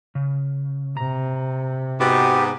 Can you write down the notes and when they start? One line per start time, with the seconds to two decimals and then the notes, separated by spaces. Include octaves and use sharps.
0.15 C#3
0.97 C3 A#5
2.00 G#2 B3 F#4 G4